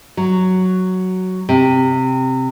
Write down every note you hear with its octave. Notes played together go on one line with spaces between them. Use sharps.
F#3
C3